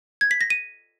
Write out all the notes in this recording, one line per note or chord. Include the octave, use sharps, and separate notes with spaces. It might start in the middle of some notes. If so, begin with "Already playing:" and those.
G#6
B6
A#6
D#7